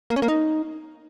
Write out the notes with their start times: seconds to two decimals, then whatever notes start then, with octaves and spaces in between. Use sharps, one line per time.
0.10 A#3
0.16 C#4
0.22 A#3
0.28 D#4